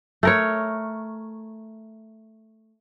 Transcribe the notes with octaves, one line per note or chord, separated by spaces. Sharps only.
A3 A#4 C#5